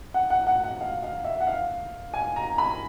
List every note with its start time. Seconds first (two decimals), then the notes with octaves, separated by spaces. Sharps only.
0.14 F#5
0.30 F#5
0.47 F#5
0.64 F#5
0.81 F5
1.03 F5
1.24 E5
1.40 F#5
1.47 F5
2.14 G#5
2.36 A#5
2.58 B5